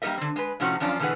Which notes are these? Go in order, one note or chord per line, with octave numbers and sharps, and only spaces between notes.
G3 A#3 D#4 A#4 D#5 E5
D3 C4
G#3 B4
A2 C3 F3 C#4 F#4
F#2 F3 C#4 D4 F4
B2 D3 E3 G#4 B4 F#5